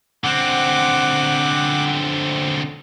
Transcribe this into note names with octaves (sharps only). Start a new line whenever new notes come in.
D3 C4 F#5 D6